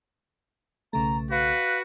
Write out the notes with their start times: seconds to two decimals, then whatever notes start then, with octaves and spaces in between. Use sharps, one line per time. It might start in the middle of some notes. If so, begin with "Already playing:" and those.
0.93 B1 C#3 A3 A#5
1.31 F#4 B4 F5